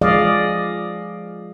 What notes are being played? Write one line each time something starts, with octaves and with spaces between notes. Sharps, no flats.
F3 G#3 G#4 D5 D#5 F5